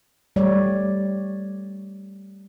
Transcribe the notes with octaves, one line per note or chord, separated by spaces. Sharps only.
G3 A3 G4 C#5 D5